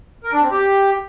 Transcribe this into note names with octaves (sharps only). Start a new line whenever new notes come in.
A#4
D4
C4
G4